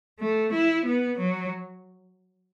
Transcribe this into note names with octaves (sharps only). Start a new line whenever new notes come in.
A3
E4
B3
F#3